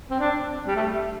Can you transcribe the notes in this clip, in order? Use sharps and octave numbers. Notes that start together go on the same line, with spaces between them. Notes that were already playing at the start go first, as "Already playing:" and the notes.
C4
D4
G3
A3